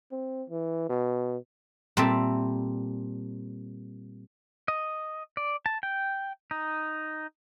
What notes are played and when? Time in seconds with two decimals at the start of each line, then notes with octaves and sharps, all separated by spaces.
0.12 C4
0.50 E3
0.89 B2
1.97 A#2 G3 C4 A4 E5
4.68 D#5
5.37 D5
5.66 A5
5.83 G5
6.51 D#4